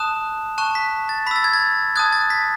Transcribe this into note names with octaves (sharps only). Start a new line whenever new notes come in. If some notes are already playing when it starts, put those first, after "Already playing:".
Already playing: A5 D#6 F#6 E7
A5 C#6 F#6 E7
B6
A6
B5 E6 A6 B6
G#6
A6
A5 D#6 F#6 G#6
A6
B6